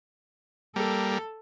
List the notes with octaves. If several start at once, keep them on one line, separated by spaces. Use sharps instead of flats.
G3 A#3 A4